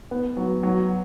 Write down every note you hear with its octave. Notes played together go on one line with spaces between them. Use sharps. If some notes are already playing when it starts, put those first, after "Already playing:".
B3
F#3
F#3